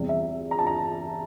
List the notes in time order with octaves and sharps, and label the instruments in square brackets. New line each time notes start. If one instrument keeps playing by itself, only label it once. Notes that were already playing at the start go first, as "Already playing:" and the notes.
Already playing: [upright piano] E2 C3 G3
E5
A#5
A5
A#5